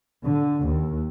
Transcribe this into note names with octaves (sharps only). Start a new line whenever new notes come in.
D3
D#2